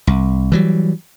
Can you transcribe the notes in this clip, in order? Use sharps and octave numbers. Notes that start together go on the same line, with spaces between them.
C2
E3 F#3 G3